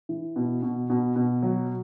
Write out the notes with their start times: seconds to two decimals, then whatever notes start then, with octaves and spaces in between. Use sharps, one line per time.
0.09 E3
0.36 B2
0.63 B2
0.90 B2
1.16 B2
1.43 F#3